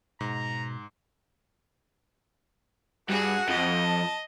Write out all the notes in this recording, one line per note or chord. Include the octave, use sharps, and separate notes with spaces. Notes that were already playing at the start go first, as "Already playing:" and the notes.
G#2 B2 A#5
G2 F#4 G#4 F#5
F2 D#5
A5